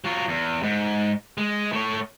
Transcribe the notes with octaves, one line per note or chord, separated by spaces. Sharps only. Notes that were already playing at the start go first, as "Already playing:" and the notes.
F#3 F4
E2
G#2
G#3
A3 C#5